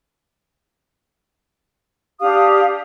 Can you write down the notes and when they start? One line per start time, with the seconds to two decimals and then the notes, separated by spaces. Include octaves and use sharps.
2.20 D4 G4 F5 D#6